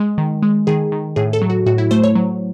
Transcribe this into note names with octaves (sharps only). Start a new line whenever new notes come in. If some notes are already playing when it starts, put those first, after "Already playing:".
Already playing: G#3
D#3
G#3
D#3 G#4
D#3
A2 G#4
A4
F#3
F#4
A2 F#4
E4
A3 C5
C#5
F#3